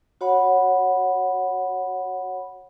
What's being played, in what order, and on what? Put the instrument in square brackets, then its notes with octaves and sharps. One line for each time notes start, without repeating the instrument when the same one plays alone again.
[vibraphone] F#4 C#5 F#5 B5